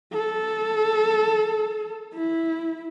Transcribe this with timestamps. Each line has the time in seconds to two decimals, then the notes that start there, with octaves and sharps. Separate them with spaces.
0.13 A4
2.14 E4